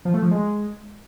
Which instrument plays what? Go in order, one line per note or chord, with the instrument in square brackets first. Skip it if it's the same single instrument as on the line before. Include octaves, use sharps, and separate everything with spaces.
[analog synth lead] F3
A3
F3
G#3